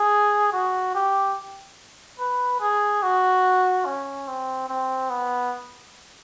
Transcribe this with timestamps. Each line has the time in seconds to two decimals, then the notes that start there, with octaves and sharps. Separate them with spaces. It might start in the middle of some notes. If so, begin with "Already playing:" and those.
Already playing: G#4
0.53 F#4
0.95 G4
2.20 B4
2.61 G#4
3.03 F#4
3.86 C#4
4.28 C4
4.69 C4
5.10 B3